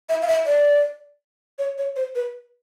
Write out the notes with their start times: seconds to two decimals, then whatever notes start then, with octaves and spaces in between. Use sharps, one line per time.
0.09 E5
0.22 F5
0.27 E5
0.46 D5
1.59 C#5
1.78 C#5
1.96 C5
2.15 B4